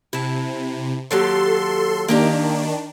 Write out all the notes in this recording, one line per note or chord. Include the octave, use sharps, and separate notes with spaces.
C3 E4 A5
D#2 F#3 G4 A4 C6
D#3 A#3 D4 G4 A#5